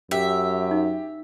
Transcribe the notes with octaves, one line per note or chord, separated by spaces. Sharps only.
F#2 G4 E5
D#4